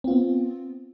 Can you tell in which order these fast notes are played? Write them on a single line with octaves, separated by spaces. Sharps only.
C4 F4 B3